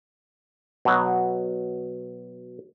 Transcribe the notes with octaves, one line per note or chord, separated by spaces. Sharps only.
B2 F#3